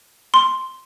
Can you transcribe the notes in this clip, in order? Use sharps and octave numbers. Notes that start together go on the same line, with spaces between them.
C6